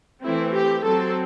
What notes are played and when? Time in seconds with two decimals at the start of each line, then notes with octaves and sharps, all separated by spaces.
0.22 E3 A3 C4 E4
0.53 G4
0.83 F#3 C4 A4